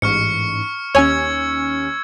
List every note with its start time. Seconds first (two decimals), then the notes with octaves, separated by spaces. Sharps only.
0.02 A1 G#2 C#6 F6 C#7
0.95 D#2 C#4 C#5 G#5 E6 G#6